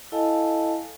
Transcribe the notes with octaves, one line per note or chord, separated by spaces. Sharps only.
E4 A4 D#5 F5 G#5 A5